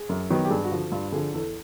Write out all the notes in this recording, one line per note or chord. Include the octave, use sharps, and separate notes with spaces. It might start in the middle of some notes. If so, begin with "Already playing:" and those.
Already playing: G#4
F#2
D#3 F#3 B3
G4
G2 G#4
F#4
D3 F3
F#4
G2 F4
D3 F3 G#4
E2 A4